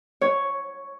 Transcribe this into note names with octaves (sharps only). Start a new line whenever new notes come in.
C#5